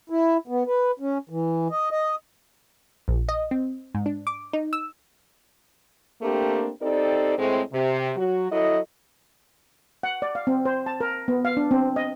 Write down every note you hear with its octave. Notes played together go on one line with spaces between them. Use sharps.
E4
B3
B4
C#4
E3
D#5
D#5
A#1
D#5
C4
G#2
D4
D6
D#4
E6
A3 A#3 C4 D4 G4 A#4
C4 D#4 G4 A4 D5
A2 G#3 C4
C3
F#3 F#4
F#3 E4 A4 D#5
F#5
D5
F5
C4
C5
A5
A#4
B3
F5
D4
C4
D#5